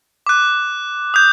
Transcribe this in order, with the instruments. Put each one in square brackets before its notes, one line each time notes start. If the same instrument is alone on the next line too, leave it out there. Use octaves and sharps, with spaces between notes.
[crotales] D6 F#6
D#6 G6